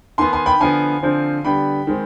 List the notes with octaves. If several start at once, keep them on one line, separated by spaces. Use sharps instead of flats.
D#3 B3 G#5 C6
G#5 C6
G5 B5
D3 F3 B3 F5 G#5
D3 F3 C4
D3 G3 B3 G5 B5
D#3 G#3 C4